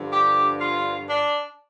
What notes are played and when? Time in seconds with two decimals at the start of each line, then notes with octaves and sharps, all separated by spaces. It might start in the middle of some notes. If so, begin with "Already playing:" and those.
Already playing: G2 D3 F3
0.13 G4
0.60 F4
1.09 D4